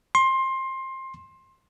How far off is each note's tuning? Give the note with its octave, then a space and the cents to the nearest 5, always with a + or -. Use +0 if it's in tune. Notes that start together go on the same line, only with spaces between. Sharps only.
C6 +20